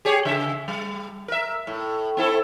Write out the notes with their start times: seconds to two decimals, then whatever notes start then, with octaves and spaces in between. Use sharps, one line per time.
0.05 G4 G#4 C#5
0.25 C#3 E5
0.68 G3
1.28 A#4 E5
1.67 A2
2.17 C4 E4 A4